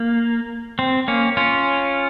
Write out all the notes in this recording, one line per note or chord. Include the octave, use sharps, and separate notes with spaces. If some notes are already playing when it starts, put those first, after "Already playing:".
Already playing: A#3
C4
A#3 C#4
C#4 F4